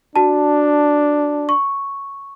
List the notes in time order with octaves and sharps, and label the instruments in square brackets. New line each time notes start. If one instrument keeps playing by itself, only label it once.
[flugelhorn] D4 [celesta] F#4 A5
[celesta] C#6